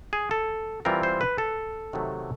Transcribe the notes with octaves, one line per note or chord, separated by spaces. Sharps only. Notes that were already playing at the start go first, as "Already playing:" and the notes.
G#4
A4
E3 G3 C4 F4 A#4
C5
B4
A4
C3 D#3 F#3 A3